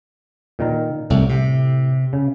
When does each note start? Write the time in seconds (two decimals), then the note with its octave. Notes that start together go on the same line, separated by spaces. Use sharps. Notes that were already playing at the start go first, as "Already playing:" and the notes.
0.59 A#2 D#3 A#4
1.10 C2 A2
1.29 C3
2.13 C#3